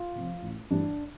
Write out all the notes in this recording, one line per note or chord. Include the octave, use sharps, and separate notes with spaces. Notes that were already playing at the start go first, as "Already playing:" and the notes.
Already playing: F4
C3 F3
A1
G2 E3 G3 D4